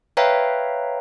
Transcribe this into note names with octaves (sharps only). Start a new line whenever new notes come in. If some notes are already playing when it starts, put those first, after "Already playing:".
B4 C#5 E5 F5 G5 A#5